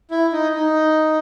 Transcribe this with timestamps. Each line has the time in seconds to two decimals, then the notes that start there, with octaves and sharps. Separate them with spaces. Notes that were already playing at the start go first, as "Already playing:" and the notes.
0.11 E4
0.33 D#4
0.55 D#4